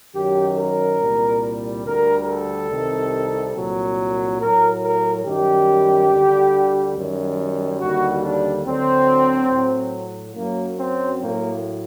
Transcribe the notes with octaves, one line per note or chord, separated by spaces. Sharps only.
F#2 D#3 F#3 G4
A#4
C2 A#2 G3
D2 D3 G3 A#4
A4
C2 C3 D#3 G3
C2 A#2 F#3
A2 F#3 A#4
A#4
F#2 D#3 G3 G4
D2 D3 G3
F#2 D#3 G3
D#2 D3 G3 F#4
D4
D2 D3 F#3 C4
A2 F#3
F#2 F#3 A#3
C4
A2 F#3 A#3